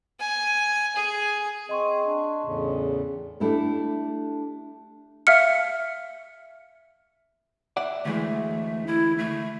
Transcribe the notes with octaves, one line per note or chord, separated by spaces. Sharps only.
G#5
G#4
C4 G#4 D#5 C6 C#6
D4
E2 A2 C#3
A3 D4 E4 G4 A4
E5 F5 F6 C#7
D5 E5 F#5
D2 E3 G#3 A3
E4
A3